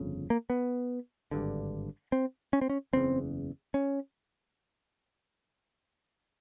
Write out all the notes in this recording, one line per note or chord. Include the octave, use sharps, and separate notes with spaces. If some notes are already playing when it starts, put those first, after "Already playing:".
Already playing: G1 F2 C#3
A#3
B3
G#1 G2 D3
C4
C#4
C4
C#4
F#1 E2 C#3 C4
C#4